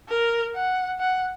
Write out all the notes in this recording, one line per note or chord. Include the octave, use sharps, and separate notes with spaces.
A#4
F#5
F#5